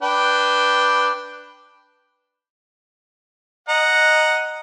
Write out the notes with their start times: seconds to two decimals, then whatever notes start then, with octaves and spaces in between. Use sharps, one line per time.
0.03 D4 B4 G5
3.69 D#5 F#5 A#5